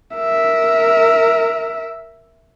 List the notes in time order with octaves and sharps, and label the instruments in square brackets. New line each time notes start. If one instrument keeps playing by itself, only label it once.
[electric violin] A#4 E5